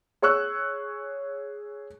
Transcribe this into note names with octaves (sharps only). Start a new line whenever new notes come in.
G#4 C#5 C#6 E6 F#6